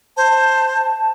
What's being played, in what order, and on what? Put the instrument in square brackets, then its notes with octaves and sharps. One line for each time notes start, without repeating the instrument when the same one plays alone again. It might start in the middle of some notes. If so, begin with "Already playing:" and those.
[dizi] C5 [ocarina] A5